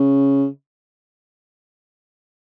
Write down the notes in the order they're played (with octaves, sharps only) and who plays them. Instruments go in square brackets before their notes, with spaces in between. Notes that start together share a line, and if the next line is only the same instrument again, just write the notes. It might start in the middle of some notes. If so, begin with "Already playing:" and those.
Already playing: [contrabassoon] C#3